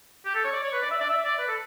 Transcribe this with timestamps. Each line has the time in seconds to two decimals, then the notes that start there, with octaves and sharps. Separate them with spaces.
0.25 G4
0.35 A4
0.44 C#5
0.53 D5
0.64 C#5
0.73 B4
0.82 D5
0.91 E5
1.01 D5
1.10 E5
1.25 D5
1.39 B4
1.48 A4